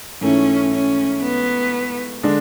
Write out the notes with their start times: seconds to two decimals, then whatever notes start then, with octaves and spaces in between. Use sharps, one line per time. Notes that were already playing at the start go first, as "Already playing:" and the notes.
0.21 G#2 E3 A3 C#4
0.72 C#4
1.23 B3
2.23 D3 G#3 D4